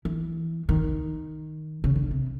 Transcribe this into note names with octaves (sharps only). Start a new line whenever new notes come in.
E3
D#3
C#3
D3
C3